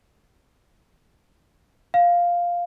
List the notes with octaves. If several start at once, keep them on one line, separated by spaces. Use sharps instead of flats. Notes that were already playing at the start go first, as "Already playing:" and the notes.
F5